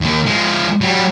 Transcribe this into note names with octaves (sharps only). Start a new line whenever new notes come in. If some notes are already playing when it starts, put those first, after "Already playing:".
D#2 D#3
F3 G#3
F#3 G3